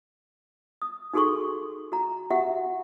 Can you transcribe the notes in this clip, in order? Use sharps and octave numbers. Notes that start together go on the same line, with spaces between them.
D#6
D#4 F#4 G#4 A4 C6 C#6
F#4 A#5
F#4 G4 E5 F#5